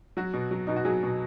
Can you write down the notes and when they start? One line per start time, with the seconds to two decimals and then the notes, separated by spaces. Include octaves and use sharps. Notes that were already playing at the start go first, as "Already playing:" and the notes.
0.17 F#3 F#4
0.34 B2
0.51 F#3
0.67 B2 D#4
0.76 F#4
0.85 F#3 G#4
1.03 B2